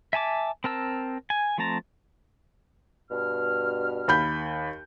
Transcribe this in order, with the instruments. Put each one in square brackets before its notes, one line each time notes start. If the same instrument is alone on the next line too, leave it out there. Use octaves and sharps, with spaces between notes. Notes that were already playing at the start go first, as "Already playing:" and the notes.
[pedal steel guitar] E5 G#5 A5 D6
C4 A#4 A5 E6
G#5
F3 A3 C4 A5 A#5
[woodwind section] G2 B2 F6
[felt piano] D#2 B5 G6